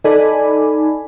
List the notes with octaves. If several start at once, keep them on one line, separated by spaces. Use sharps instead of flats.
D#4 A4 D5 G#5 B5